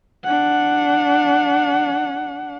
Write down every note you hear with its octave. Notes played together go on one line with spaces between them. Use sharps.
D4 F#5